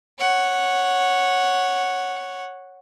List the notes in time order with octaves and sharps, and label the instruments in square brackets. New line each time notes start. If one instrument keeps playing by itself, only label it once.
[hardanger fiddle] C#5 F#5